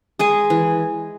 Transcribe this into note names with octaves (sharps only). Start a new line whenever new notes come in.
G#3 G#4 G#5
E3